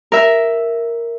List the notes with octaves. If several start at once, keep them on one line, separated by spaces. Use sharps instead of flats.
A#4 E5